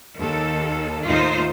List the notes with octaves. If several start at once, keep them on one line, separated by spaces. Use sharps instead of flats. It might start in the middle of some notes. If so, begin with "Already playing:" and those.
D#2 A4
D#2 A2 D#4 F4 C5